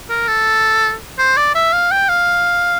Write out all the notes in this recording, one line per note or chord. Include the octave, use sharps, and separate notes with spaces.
A#4
A4
C5
D5
E5
F5
G5
F5